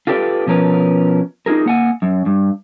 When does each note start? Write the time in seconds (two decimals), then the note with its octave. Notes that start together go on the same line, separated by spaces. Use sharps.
0.07 F4 G4 A4 B4 C#5 D5
0.47 B2 F3 C#4 A#4 B4
1.46 D#4 F4 G#4 A#4
1.66 A#3 F#5 G#5
2.02 F#2
2.26 G2